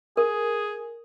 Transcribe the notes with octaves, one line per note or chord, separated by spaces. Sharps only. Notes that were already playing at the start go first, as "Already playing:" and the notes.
G#4 A#4